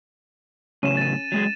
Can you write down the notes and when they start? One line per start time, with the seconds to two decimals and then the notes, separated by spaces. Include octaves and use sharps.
0.83 A2 C#3 F#3 C#4 D#7 E7
0.97 A6 D#7
1.32 F#3 G#3 G#4